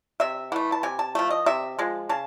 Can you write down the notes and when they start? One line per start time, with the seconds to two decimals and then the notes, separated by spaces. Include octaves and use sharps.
0.20 C3 E5
0.52 E3 F#5
0.56 A3
0.72 A5
0.83 C3 G#5
0.99 A5
1.15 F3 A3
1.31 D#5
1.46 C3 E5
1.79 F3 G#3
2.09 C#3 A5